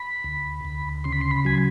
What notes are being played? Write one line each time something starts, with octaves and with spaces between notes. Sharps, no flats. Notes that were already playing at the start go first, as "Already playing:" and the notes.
Already playing: B5
D2
D2
C#3 C6
B5
C6
B5
F#3 G#5